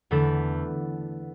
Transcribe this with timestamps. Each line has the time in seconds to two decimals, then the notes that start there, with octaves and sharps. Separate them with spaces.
0.11 E2 D3 A3 E4 A4